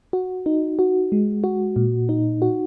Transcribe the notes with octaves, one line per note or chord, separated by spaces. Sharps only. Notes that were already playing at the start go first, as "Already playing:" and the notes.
F#4
D#4
F#4
G#3
F#4
A#2
D#4
F#4